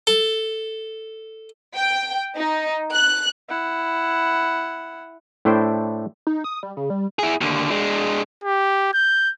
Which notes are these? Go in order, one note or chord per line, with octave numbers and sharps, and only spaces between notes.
A4
G5
D#4
F#6
E4 F#5
A2 A3 D4 E4 C5 G5
D#4
D#6
G3
C#3
G3
E4 G#4
D#2 D3
G#3 D4
G4
G6